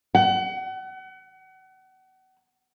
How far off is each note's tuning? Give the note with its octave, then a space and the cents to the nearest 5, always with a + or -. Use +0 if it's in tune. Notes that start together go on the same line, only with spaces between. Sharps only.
F#5 +35